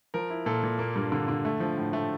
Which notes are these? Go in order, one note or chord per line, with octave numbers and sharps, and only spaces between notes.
F3 A#4
E4
A#2 A4
A#2
A#3
G2
D3
D3
A3
F3
A2
A3